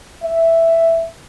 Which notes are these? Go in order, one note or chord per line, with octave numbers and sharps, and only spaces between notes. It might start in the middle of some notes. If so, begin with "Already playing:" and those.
E5